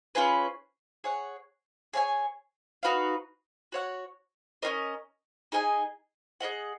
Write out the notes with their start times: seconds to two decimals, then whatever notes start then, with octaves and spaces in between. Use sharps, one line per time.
0.15 C#4 F4 G#4 B4
1.04 G#4 C#5 F#5
1.93 G#4 C#5 F5 G#5
2.83 D#4 F#4 B4 F5
3.72 F#4 C#5 F#5
4.62 C#4 F4 A#4 D#5
5.52 D#4 G#4 D#5 G#5
6.40 G#4 B4 D#5 F#5